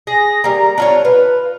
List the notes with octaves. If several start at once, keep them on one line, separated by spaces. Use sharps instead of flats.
G#4 A#6
G3 A#3 A#5
D4 F4 C#5
F4 B4